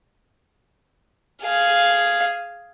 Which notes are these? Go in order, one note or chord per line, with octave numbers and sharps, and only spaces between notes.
G#4 F5